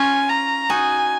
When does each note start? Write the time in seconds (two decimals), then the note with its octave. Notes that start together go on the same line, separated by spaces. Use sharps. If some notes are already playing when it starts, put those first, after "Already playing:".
Already playing: C#4 F4 G#5
0.29 A#5
0.69 D#4 F#4 G#5